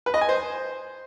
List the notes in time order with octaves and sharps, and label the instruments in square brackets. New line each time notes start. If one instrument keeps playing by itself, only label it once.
[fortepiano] B4
D#5
G#5
C5